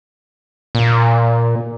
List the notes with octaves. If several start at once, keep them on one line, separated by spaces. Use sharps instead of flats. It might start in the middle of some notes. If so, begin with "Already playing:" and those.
A#2